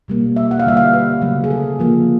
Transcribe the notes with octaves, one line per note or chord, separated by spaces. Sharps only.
B2 G3 A#3
E5
F#5
F5
D3 G3 A#3 E5
F5
B4
C#3 F#3 A3
G#4
A4
D3 F3 A#3